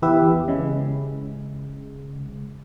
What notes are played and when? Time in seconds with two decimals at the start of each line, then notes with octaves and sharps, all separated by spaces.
0.02 E2 E3 B3 G4 B4 E5
0.48 C#3 G#3